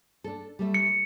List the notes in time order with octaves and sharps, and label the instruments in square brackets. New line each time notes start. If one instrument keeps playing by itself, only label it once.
[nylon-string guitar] D4 A4
G3 A3 E5
[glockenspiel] C#7